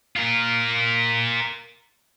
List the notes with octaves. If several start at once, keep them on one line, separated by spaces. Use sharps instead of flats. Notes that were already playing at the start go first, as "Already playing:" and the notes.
F4 A#4